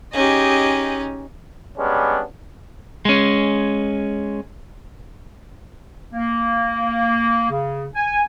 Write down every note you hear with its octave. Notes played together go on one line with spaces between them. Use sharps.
C#4 D#4 G4 G#4 D#5
G3 G#3 B3 C#4 D4
G#3 C#4
A#3
C#3
G#5